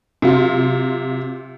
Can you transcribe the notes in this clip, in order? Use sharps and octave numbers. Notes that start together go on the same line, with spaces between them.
C3 F#3 F4